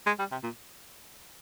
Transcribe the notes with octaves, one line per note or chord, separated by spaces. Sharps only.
G#3
G3
C3
A#2